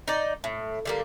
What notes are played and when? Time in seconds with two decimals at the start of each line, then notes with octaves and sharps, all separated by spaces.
0.08 D#4 D5
0.44 A2
0.85 D3 G3 A#3